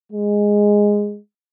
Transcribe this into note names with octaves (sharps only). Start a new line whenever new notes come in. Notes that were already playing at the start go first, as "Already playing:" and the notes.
G#3